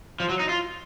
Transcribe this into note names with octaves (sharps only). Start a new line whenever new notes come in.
F3
F#3
D#4
F4